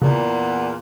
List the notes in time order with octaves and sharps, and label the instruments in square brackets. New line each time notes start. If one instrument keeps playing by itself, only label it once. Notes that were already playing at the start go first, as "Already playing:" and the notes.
[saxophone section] E2 A#2 [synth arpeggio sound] C#3